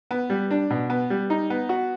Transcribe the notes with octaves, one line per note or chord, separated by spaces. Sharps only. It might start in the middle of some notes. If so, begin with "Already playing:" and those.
B3
G3
D4
B2
B3
G3
D#4
B3
F#4